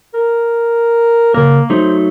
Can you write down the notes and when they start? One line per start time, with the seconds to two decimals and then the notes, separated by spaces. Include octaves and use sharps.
0.14 A#4
1.34 C#3 A#3 A#4
1.70 F#3 A3 D#4 C5